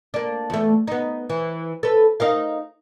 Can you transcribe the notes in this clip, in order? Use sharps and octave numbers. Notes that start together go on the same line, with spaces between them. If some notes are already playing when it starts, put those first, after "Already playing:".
A#3 D4
E2 A3
B3 D#4
E3
A4 B4
D#4 A#4 F5